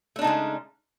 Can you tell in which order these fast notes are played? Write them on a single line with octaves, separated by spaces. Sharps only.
A3 D4 D#4 C#3 G#3